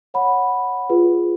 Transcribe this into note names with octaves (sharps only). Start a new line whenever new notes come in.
C#5 F#5 B5
F4 G#4 B4